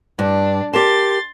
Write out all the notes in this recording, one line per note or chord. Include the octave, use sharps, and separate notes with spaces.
G2 D4
G4 A#4 A5 C6 A6